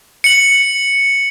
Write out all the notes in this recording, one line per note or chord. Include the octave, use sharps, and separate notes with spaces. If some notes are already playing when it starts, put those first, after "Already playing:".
C#7 F#7